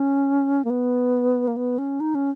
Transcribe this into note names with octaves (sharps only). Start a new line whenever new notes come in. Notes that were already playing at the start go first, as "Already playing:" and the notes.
Already playing: C#4
A#3
B3
A#3
B3
C#4
D#4
C#4